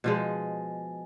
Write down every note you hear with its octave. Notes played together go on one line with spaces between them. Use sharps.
B2 F3 G#3